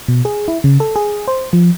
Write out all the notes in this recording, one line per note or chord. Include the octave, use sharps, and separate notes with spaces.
B2
G#4
E4
C#3
A4
G#4
C5
F3